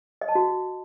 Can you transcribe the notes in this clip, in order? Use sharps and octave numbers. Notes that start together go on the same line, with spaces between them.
D#5
A5
F#4